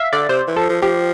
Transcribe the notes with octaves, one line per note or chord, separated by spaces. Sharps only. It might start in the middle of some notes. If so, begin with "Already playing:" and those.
Already playing: E5 F5
D3 D5
C3 C5
E3
F3 A4
F3
F3 G4